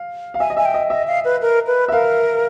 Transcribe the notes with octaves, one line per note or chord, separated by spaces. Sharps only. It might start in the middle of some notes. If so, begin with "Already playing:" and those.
Already playing: F5
F5
E5 G#5
D#5
E5 G#5
G5
D#5
D#5 E5
F5
B4
A#4
B4
E5
A#4 F5